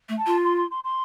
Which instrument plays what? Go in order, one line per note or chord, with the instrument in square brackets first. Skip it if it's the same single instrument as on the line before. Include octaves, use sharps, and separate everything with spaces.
[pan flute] A3
[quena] A5
[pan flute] F4
[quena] C6
C6
C6
C6